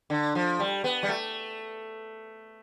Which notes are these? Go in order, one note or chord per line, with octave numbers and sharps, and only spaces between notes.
D3
F3
G3
B3
G3
A3